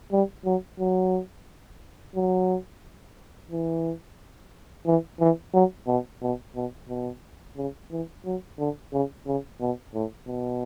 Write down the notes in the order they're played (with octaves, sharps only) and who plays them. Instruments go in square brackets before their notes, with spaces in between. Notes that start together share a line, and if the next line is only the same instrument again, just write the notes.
[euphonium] G3
F#3
F#3
F#3
E3
E3
E3
F#3
B2
B2
B2
B2
C#3
E3
F#3
D3
C#3
C#3
B2
A2
B2